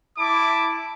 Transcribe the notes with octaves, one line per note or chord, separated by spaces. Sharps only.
E4 A5 D6